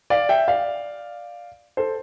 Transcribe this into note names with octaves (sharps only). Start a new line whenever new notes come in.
D5 F5
E5 G5
D5 F5
A4 C5